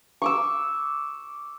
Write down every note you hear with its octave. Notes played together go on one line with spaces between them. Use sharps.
C#6 D6 E6